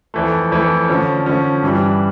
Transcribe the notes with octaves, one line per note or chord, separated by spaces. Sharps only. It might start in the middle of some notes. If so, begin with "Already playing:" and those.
F2 E3 A3
F2 E3 A3
D3 F3 C#4
D3 F3 C#4
G2 E3 G3